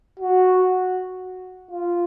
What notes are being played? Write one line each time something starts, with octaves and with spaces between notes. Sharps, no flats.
F#4
F4